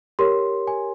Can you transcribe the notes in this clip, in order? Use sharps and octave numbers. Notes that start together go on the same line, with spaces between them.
G4 A#4 C#5 C6
G#5